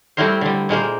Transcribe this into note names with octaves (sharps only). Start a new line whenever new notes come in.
G3 A3 C4 E4 A#4 C5
D3 G3
A#2 G#3 A#3 C5